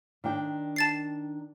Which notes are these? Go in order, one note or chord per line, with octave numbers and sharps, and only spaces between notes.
D#3 D4 G5
A5 A6 C7